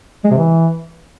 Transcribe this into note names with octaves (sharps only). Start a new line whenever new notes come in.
G#3
C3
E3